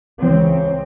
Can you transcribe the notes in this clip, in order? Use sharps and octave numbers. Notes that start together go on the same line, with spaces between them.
C#2 E3 C4 C#5